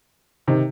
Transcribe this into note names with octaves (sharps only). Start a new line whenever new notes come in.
C3 D#3